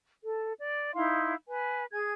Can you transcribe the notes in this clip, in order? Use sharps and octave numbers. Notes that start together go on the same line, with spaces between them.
A4
D5
D#4 E4 F5 C6
B4 G#5
G#4 G#5 G#6